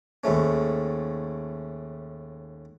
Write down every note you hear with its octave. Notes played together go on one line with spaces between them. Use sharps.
D#2 G#2 A3 C#4